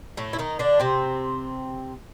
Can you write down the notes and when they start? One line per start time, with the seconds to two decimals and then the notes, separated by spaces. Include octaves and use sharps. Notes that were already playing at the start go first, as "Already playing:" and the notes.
0.17 A2 A3
0.33 E4
0.39 D#3 D#4
0.59 D3 D4
0.80 C3 C4